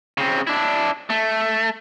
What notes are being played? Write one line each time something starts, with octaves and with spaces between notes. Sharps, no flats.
C#3 C4
D4 E4
A3